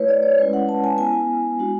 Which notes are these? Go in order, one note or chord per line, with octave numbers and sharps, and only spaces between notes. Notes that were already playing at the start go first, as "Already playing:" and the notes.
Already playing: A3 E4 B4 C#5
D5
C#5
G#3 C#4 E4 B4
F#5
A5
G#5
B3 E4 G#5
G#3 D4 F#4